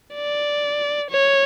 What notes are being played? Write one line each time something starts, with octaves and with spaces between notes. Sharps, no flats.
D5
C#5